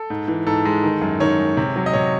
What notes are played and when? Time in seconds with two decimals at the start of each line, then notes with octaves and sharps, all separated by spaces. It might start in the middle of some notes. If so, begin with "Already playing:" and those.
Already playing: A4
0.10 G#2
0.28 E3
0.47 G#2 A4
0.65 G#3
0.83 D#3
1.01 F#2
1.20 D#3 C#5
1.39 G#3
1.57 C3
1.76 F#3
1.86 D#5
1.93 C3 C#5